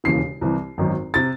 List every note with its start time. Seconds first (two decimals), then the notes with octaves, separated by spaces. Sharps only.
0.04 E1 D#2 C#3 E3 C7
0.41 C2 C3 E3
0.78 G#1 F#2 D#3
1.14 C3 A6